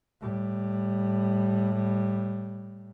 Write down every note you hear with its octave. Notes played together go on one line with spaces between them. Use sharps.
A2 G3